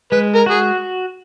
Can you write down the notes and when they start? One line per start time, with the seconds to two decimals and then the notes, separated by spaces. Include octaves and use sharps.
0.12 G#3 B4
0.35 A#4
0.46 F#4 G#4